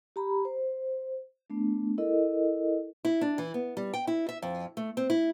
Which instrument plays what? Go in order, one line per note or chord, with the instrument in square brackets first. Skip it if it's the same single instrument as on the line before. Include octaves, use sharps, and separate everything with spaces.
[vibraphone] G4 A#5 B5
C5
A3 B3 D4
E4 A4 A#4 D#5
[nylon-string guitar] E4
D4
E3
B3
G3
G5
E4
E5
F2
A3
C4
E4